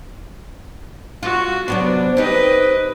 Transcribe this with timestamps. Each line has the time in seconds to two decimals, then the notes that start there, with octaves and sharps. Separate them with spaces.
1.23 F4 F#4
1.68 C3 F#3 B3 D4
2.17 C4 D#4 G4 B4 D#5